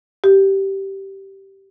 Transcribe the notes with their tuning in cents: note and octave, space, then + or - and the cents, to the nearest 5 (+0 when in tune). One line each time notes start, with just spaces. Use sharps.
G4 -10